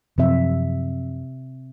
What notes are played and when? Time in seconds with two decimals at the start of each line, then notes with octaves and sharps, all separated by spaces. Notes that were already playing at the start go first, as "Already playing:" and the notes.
0.18 F#2 C3 F3 C4 E5